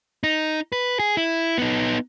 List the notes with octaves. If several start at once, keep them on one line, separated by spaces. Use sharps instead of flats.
D#4
B4
G#4
E4
B3 D#4